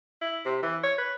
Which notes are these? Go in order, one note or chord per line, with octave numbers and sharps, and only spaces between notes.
E4
C3
E3
C#5
B4